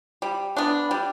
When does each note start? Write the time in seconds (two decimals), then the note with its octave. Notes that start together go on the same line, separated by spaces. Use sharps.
0.22 G3
0.57 B3 D4
0.91 G3